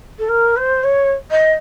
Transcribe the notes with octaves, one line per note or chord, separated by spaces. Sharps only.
A4
A#4
C5
C#5
D#5